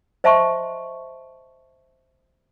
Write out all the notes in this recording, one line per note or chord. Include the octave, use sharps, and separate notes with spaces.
C5 D#5 E5 A5 C6 C#6